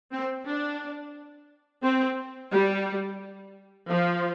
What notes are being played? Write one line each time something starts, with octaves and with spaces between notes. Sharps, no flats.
C4
D4
C4
G3
F3